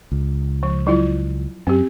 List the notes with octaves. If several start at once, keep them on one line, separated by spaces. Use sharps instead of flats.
C#2
F3
F#3 E4 F4
F#2 C4 G4